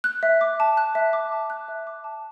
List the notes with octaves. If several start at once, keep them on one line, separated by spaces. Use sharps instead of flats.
F#6
E5
D6
A5
F#6
E5
D6
A5
F#6
E5
D6
A5